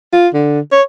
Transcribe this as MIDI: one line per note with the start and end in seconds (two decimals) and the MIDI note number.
0.13 0.28 65
0.34 0.60 50
0.72 0.82 73